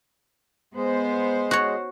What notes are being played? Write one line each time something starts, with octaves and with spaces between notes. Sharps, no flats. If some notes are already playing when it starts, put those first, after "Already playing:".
G#3 B3 C5
F#4 C#5